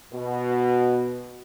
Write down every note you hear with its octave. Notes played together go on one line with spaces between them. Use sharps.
B2